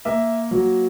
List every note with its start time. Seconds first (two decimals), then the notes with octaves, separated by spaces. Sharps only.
0.05 A#3 E5
0.51 F#3